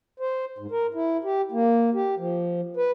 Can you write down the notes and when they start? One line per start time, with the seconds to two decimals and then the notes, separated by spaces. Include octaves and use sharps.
0.20 C5
0.59 G#2
0.72 A#4
0.94 E4
1.24 G4
1.52 A#3
1.94 G4
2.18 F3
2.77 B4